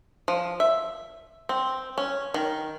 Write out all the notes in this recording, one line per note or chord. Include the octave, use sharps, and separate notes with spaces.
F3
E5
C4
C#4
D#3